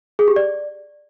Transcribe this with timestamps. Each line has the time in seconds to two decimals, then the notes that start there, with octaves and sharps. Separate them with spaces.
0.19 G#4
0.28 G4
0.36 D5